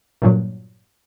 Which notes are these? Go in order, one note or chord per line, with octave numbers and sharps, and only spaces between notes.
G2 A#2 F#3